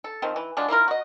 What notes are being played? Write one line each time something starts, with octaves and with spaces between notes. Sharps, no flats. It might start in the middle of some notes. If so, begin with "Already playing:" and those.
A4
D#3 F3 C4
E3
F3 F#3 G#3 D4
A#3 E4 F4 A#4
F#4 D#5